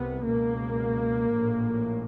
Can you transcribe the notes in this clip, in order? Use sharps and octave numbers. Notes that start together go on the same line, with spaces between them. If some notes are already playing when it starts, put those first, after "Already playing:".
Already playing: C2 C3 B3
C#2 B2 A#3
A#1 A2